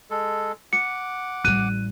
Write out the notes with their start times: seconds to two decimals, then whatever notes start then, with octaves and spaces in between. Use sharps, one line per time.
0.10 G#3 A4
0.73 F#5 D6 C#7
1.44 A1 G3 F#6 D#7